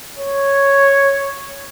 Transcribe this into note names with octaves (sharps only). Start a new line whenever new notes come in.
C#5